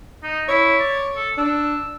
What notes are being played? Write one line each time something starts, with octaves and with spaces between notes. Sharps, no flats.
D#4
E4 C#5
D5
A4
D4 E6